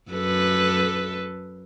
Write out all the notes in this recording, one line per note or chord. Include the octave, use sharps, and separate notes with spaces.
F#2 A4 B4